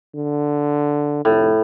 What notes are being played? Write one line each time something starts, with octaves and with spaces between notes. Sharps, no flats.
D3
F1 A2